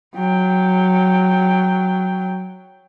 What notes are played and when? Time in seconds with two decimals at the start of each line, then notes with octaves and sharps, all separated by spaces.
0.16 F#3 G5